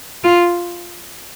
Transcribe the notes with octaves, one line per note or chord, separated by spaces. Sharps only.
F4